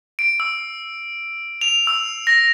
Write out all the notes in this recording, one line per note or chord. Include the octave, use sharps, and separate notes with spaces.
D7
E6
F7
E6
A#6